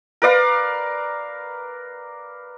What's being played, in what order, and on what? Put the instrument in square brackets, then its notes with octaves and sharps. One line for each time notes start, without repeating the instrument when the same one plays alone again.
[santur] A#4 B4 D5 F5